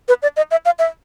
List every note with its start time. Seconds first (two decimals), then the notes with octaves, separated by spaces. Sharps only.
0.08 B4
0.22 D5
0.37 D#5
0.51 E5
0.65 F5
0.79 E5